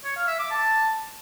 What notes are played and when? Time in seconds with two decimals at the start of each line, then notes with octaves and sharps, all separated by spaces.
0.04 C#5
0.16 F5
0.28 E5
0.39 D6
0.51 A5